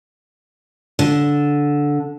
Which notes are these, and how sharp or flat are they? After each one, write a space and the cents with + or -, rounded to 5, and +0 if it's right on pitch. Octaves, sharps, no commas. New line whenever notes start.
D3 -10